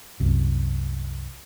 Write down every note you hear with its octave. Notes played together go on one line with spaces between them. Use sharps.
C2 F#2